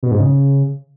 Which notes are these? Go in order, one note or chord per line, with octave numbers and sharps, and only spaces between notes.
B2
G#2
C#3